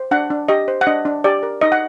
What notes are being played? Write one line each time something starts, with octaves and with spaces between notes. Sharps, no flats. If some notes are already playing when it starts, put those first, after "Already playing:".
Already playing: C5
D4 F#5
D4
G4 D#5
C5
F#5
D4 D#5
D4
G4 D5
A#4
D#4 D#5
F#5